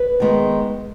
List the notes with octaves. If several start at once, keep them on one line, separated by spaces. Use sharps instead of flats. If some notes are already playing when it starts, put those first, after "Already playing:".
Already playing: B4
D#3 G#3 B3